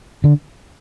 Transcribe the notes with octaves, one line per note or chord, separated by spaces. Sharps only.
D3